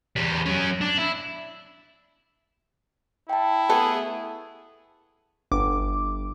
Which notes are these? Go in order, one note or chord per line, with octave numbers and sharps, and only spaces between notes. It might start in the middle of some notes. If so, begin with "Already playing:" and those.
E2 G3
F#3 C#4
D4
E4
E4 G5 A5
A3 B3 G#4 A4
G1 D6